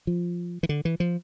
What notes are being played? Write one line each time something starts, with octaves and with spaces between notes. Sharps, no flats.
F3
E3
D3
E3
F3